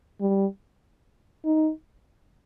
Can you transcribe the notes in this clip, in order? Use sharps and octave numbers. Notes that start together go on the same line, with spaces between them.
G3
D#4